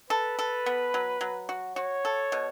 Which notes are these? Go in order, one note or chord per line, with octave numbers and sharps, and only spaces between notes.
A4 B4
A4
B3
F#3
F#3
F#4
F#4 C#5
A4
B2